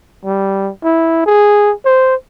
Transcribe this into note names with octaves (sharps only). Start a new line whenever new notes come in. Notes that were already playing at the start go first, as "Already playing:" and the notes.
G3
E4
G#4
C5